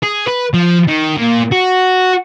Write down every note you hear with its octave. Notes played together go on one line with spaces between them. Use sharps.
G#4
B4
F3
D#3
A#2
F#4